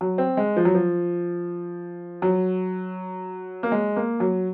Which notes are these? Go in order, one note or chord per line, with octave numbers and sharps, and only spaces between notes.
F#3
C4
G#3
F3
F#3
F3
F#3
A#3
G#3
A#3
F#3